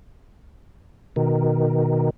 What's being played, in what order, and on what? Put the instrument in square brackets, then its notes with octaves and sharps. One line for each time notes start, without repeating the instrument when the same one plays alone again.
[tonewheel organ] B2 D#3